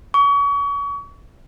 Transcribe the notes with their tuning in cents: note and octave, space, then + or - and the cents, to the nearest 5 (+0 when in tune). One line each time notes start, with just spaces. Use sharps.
C#6 +35